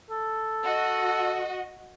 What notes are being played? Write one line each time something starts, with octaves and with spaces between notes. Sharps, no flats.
A4
F#4 D#5